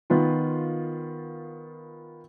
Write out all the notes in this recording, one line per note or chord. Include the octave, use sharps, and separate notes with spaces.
D#3 B3 F4